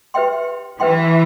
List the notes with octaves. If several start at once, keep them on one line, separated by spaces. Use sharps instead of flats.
G4 B4 E5 G5 C6
E3 G4 B4 E5 G5 C6